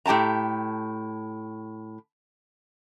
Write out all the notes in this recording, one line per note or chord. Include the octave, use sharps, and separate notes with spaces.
A2 G4 G5 A5 A#5